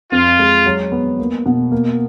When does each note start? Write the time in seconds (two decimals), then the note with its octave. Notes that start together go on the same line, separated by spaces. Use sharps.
0.11 F2 F4
0.39 G#3
0.66 F#3
0.92 B3
1.19 A#3
1.46 B2
1.72 A#3